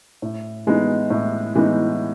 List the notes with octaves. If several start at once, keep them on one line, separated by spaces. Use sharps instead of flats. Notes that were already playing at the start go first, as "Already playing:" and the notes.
A2
E3 G#3 B3 D#4
A2
E3 G#3 B3 D#4